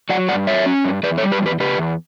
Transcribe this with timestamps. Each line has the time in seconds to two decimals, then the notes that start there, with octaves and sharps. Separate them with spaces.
0.09 F#3 D5 F#5
0.28 G2 D5 F#5
0.47 F#3 C#5 E5
0.66 C#4
0.84 G2
1.03 E2 B4 D5
1.18 A4 C#5
1.23 G3
1.32 G4 B4
1.41 E2
1.46 G4 B4
1.60 C#3 G4 B4
1.78 E2